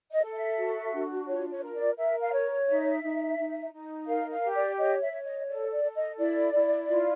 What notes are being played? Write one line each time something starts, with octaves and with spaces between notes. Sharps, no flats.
D#5
A4
E5
F#4
D4
F4 C#5
C#5
A#4
D5
A#4 E5
F5
C#5
D#4 E5
D#4
D#4
D#4
A#4 F5
F5
G4
D5
C#5 D#5
E5
C#5
D#5
A4 D5
D5
A4
D#5
E4 D5
E4
F4